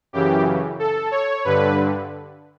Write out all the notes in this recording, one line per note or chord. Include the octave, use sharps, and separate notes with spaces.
F#2 C#3 E3 G4
A4
C#5
G2 D3 B4